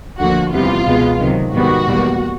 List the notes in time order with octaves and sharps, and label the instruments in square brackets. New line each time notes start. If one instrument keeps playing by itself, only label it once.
[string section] D2 D3 F3 A#3 F#4
E2 C3 E3 G3 B3 F4
C#2 B2 G#3 B3
C#2 C3 D#3 F#3
G#2 D#3 G3 B3 F#4
E2 B2 G3 A#3